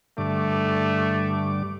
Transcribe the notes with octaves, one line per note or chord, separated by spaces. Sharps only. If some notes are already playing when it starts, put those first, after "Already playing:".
G2 D3 A3 D6